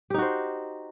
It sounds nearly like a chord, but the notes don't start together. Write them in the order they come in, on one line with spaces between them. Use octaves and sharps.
G4 D#4 F#4 C5